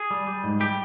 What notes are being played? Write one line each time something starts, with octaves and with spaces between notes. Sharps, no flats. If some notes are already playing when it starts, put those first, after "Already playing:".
Already playing: G#4
G3
G3
G#2
G3 G4